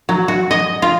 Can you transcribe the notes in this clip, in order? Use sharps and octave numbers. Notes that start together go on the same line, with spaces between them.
F#3
F#4
D#5
F4